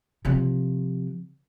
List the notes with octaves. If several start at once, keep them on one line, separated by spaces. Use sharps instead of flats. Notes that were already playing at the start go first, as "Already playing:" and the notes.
C3 F3